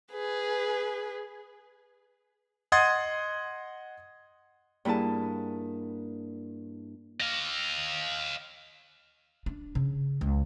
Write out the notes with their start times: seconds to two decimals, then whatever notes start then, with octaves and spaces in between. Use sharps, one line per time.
0.13 G#4 B4
2.72 D#5 F#5 C6 D#6 G#6 A6
4.85 G2 A#3 E4 G#4 A5
7.20 D#5 F5
9.46 D4
9.75 C#3
10.21 C#2